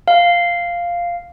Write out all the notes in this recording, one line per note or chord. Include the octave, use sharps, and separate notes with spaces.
F5